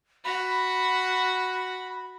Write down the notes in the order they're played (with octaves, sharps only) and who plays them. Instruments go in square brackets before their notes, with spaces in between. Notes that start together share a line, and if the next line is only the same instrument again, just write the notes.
[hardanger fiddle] F#4 [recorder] B5